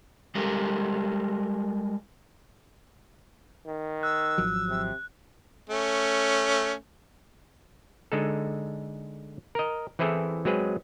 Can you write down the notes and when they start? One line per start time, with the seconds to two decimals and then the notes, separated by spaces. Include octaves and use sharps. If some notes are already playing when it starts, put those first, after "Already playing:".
0.35 G3 G#3 G4 A4 A#4
3.66 D#3
4.03 E6 F#6
4.38 G#1 F3 F#3
4.68 C3
5.70 A3 C#4
8.12 D3 G#3 D#4 A4
9.55 A#4 D#5
9.99 E3 C4 E4 G#4 A4
10.45 F#3 G#3 C4 G#4 B4